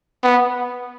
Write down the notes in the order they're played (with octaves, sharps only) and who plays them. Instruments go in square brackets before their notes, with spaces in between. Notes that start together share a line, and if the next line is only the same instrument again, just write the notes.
[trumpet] B3